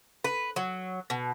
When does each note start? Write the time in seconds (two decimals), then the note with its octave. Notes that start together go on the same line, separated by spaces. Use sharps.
0.24 B4
0.56 F#3
1.10 B2